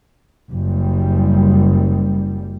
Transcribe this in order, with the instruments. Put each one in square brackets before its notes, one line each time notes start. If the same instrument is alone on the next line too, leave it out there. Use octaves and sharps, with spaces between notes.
[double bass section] F#1 G3